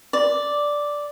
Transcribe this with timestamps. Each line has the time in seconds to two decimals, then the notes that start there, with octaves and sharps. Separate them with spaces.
0.13 D5